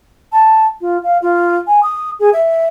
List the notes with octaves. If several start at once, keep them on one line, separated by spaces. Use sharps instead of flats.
A5
F4
F5
F4
G#5
D#6
G#4
E5